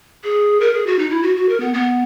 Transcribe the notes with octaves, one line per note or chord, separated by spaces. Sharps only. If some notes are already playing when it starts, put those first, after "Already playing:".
G#4
A#4
G#4
F#4
D#4
E4
F#4
F#4
A#4
B3
B3